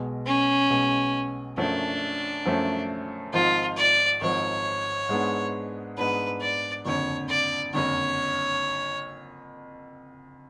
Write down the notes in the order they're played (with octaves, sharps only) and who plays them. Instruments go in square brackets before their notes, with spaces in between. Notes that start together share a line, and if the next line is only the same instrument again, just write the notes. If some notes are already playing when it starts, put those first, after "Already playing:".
Already playing: [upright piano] B1 B2 G#3
[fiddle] C#4
[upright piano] B1 B2 G#3
[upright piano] F#2 F3 A3 C#4 [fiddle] D4
[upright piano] F#2 F3 A3 C#4
[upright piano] G#1 G#2 F3 [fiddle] F4
[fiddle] D5
[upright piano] G#1 G#2 F3 [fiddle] C#5
[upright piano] G#2 G#3 B3 D4
[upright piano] G#2 G#3 B3 D4 [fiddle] B4
[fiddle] D5
[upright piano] F#1 F2 D3 [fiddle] C#5
[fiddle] D5
[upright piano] F#1 F2 D3 [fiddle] C#5